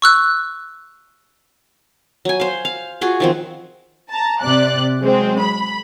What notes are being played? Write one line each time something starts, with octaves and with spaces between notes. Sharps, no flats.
C#6 E6 F#6
F#3 G#5
C5 F5
F5
F4 F#4 G#4
D#3 F3 C4
A5 A#5
C3 D5 F#6
F#3 G#3 C4
B5